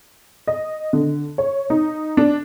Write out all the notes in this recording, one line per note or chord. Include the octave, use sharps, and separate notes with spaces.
D#5
D3
C#5
D#4
D4